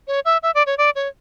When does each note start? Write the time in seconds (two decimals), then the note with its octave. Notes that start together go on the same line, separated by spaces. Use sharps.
0.07 C#5
0.25 E5
0.43 E5
0.55 D5
0.66 C#5
0.78 D5
0.95 C#5